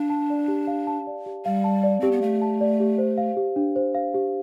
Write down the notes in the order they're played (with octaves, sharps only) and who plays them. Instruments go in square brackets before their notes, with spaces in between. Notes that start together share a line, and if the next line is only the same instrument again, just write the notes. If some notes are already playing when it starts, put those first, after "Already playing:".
Already playing: [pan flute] D4 [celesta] F5
[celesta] A5
D5
G4
F5
A5
D5
G4
[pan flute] G3 [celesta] F5
[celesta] A5
D5
[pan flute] C4 [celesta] G4
[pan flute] B3
[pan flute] A3 [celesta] F5
[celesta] A5
D5
G4
C5
F5
G4
D4
C5
F5
G4